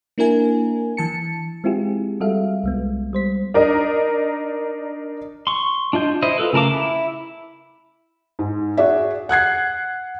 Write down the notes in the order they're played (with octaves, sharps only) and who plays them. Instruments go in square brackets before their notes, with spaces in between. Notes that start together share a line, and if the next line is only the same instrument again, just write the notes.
[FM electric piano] A#3 D4 E4 A#4 G#5
E3 A5 C#7
[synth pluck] G#3 C4 E4 F4 G4 G#4
G3 F#4 A4 E5 F5
C2 G#3 B3
G3 C5 B6
[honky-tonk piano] D4 D#4 A#4 D5 D#5
[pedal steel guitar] C6 C#6
D4 F4 D#5 G6
E4 C5 D#5
F4 A4 B4
C#3 A3 A#4 A5 D6
E4
[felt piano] G#2
F#4 G#4 D5 E5
F#5 F#6 G#6 C7